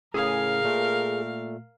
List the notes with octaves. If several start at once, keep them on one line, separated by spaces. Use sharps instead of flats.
A2 C#3 G#4 A#4 F5
A#2 A3